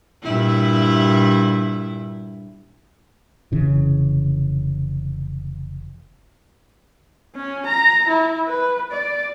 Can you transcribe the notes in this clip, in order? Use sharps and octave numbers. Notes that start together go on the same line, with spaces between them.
G2 A#2 E4
F1 C#3 E3
C#4
A#5
E4
B4
D5